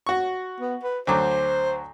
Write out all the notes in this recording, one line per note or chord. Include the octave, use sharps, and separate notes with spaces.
F#4 C#6
B3
B4
D2 F#3 C5 D6